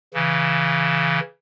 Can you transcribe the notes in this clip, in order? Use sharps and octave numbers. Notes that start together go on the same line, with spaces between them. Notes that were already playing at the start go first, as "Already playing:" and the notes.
C#3 E3